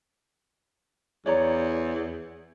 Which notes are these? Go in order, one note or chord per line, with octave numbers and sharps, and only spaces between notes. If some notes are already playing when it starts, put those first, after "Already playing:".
E2 C#5 D5 A#5